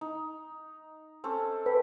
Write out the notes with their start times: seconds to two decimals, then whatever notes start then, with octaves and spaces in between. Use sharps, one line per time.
0.01 D#4
1.24 C4 C#4 A4
1.66 B4 G5